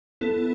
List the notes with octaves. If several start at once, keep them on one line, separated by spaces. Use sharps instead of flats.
B3 E4 A4